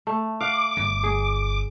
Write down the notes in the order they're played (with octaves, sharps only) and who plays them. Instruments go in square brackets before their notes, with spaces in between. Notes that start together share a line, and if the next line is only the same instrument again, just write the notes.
[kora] A3
[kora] F5 F#5 [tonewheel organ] D6
[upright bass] G1
[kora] G#4